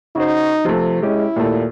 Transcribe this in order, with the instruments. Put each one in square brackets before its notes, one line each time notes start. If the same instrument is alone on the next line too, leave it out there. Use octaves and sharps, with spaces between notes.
[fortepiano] C#3 F#4 C5 [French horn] D#4
[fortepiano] C3 A3 [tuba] F3
[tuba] G#3 [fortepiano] C#4 G4 [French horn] E4
[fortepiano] D#2 A3 [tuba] A#2